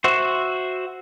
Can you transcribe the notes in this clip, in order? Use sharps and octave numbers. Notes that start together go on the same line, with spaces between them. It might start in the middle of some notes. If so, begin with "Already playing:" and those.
F#4 C5 E5